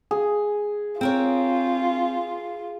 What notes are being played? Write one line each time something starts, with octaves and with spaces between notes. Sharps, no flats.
G#4
C4 F4 A#4 C#5